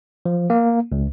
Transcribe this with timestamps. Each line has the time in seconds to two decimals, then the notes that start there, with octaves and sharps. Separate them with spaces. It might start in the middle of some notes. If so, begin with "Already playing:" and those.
0.26 F3
0.50 A#3
0.92 C#2